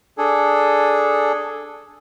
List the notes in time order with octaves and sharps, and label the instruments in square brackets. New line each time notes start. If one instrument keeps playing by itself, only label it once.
[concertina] D4 G#4 A4